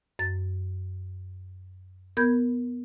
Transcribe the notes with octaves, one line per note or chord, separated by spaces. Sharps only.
F#2 A6
B3 A#4 B5 G6 G#6